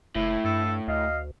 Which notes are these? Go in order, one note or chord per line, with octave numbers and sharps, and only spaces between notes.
F#1 A2 E4
G2 A4
D2 D#5 F5